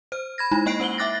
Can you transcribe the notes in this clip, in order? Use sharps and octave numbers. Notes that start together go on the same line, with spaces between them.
C5 F6
B5 G#6 A#6
G#3 D#4 E4 B5
A#3 D#5 G5 F#6 C7 D7
C#4 C5 F#7 G7
E5 G5 D6 F#6 A6 A#6